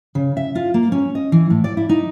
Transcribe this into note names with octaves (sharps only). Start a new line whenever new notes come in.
C#3
E5
F4
A#3
C#4
D#5
E3
A2
D5
E4
D#4